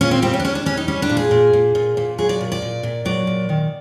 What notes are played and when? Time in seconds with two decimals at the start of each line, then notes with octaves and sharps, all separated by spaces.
0.01 A#2 C#4
0.11 C4
0.22 G3 C4
0.33 C#4
0.40 D4
0.44 G3 C#4
0.55 D4
0.66 G3 C#4
0.77 D#4
0.88 G3 C#4
1.02 D4
1.10 A#2
1.17 G#4
1.31 A#2
1.53 A#2
1.75 A#2
1.97 A#2
2.18 F#3 G#4
2.29 D5
2.41 A#2
2.52 D5
2.62 A#2
2.83 A#2
3.05 F#3 D5
3.27 A#2
3.49 D#3